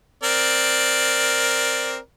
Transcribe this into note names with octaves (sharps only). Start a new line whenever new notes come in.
C4 A#4 D5